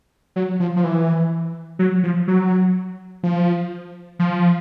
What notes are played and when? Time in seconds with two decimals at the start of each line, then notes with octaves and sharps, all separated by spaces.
0.36 F#3
0.60 F3
0.76 F3
0.84 E3
1.79 F#3
2.03 F3
2.28 F#3
3.23 F3
4.19 F3